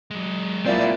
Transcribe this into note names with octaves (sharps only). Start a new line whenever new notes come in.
F#3 G#3
A#2 C4 E4 D5